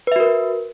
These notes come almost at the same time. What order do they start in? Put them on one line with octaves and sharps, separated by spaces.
B4 E5 F#4 A#4